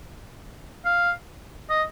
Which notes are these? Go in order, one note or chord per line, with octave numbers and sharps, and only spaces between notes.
F5
D#5